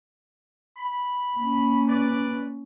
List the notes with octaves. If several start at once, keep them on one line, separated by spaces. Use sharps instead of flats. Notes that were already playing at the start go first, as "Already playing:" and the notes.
B5
A#3 C#4
B4 D5